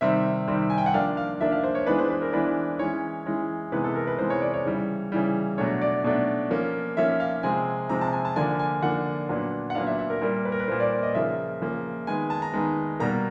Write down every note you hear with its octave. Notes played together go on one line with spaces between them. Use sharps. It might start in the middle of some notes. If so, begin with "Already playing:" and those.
C3 D#3 G3 C4 E5
C3 D#3 G3 C4
G#5
G5
F#5
F3 A#3 D4 F5
F5
F3 A#3 D4 E5
F5
C5
C#5
E3 G#3 B3 D4 B4
C5
B4
A#4
E3 G#3 B3 D4 B4
E3 G#3 C#4 C#5
E3 G#3 C#4
C3 E3 G#3 B3 B4
A4
A#4
B4
C3 E3 G#3 B3 C5
C#5
D5
C#5
C#3 E3 G3
C#3 E3 G3
B2 F#3 A3 D4 C#5
D5
B2 F#3 A3 D4
F3 A#3 C#4
F3 A#3 C#4 E5
F5
C3 F3 G#3 C4 G#5
C3 F3 G#3 C4 A#5
A5
G#5
A5
D3 F3 A#3 D4 G#5
G#5
D3 F3 A#3 D4 F#5
A#2 F#3 B3 D4
F#5
A#2 F#3 B3 D4 F5
E5
E5
A#4
A#2 G3 A#3 A#4
B4
A#4
B4
A#2 G3 A#3 C5
D5
D#5
C#3 F3 A#3 E5
C#3 F3 A#3
D#3 G#3 B3 G#5
A5
A#5
D#3 G#3 B3
B2 G3 A#3 A#5